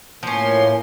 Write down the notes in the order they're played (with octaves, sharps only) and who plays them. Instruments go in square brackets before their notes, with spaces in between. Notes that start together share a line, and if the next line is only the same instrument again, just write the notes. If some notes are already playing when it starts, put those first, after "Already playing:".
[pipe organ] A2 A#3 C6 [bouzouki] F3 C#4